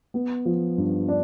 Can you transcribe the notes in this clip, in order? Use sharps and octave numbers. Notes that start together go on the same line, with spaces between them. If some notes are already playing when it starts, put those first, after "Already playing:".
B3
F3
G2
D4